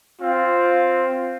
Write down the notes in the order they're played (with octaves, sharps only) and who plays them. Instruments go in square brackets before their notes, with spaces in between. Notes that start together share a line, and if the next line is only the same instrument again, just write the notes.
[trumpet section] C4 F4